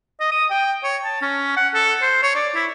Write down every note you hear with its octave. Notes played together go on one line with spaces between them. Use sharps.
D#5
D#6
G5
C#5
A5
C#4
F#5
A4
C5
C#5
D5
E4